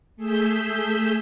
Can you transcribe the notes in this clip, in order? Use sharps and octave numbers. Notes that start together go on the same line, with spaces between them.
A3 G#4 E6 G6 B6